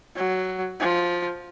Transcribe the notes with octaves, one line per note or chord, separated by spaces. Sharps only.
F#3
F3